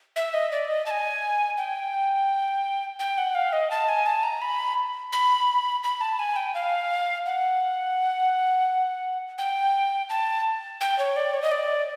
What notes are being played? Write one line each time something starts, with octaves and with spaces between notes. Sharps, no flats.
E5
D#5
D5
D#5
A5
G#5
G5
G5
F#5
F5
D#5
A5
G#5
A5
A#5
B5
B5
B5
A5
G#5
G5
F5
F#5
G5
A5
G5
C#5
D5
C#5
D#5
D5